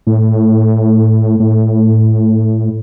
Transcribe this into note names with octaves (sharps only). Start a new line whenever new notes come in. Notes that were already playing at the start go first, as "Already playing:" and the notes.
A2
A2